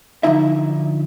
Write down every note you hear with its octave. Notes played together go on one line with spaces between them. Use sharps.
D3 D#3 F3 D#4 E4 E5